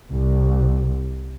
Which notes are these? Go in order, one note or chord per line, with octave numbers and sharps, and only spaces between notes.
C2